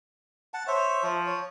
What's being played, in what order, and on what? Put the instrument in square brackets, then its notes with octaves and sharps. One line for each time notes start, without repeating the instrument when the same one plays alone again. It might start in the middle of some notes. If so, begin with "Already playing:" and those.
[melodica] F#5 A5
[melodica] C5 E5 [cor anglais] C#5
[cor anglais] F3
[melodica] C#5